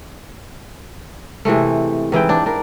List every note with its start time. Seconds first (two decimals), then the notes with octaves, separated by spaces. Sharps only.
1.45 C3 E3 G#3 A3
2.12 G#2 E3 E4 G5
2.29 D4
2.46 D4 A#4